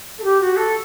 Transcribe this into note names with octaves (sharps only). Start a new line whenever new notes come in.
A4
G4
F#4
A4